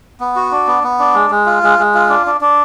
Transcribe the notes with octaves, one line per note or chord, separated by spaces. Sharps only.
B3
F#4
D4
B3
B3
D4
G#3
G#3
F4
G#3
G#3
F4
D4
D4
D4